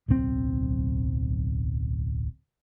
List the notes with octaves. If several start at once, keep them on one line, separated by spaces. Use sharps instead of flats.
D1 B1 C3 C4